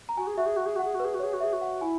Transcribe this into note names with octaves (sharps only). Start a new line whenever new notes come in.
A#5
F#4 G#5
G#4
F#4 E5
G#4
F#4
G#4
F#4 F#5
G#4
F#4
B4
G#4
F#4
G#4 C#5
F#4
G#4 E5
F#4
F#5
E4 G#5